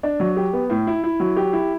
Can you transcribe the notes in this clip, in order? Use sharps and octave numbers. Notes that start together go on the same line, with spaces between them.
D4
F#3
G4
B3
A2
E4
E4
F#3
G4
E4